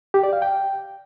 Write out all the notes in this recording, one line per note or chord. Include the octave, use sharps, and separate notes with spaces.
G4
D5
F5
G5